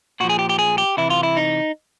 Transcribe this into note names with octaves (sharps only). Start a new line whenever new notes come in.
A#2 F3 F#4
G#4
G4
G4
G#4
G4
C3 E3 E4
F4
E4
D#4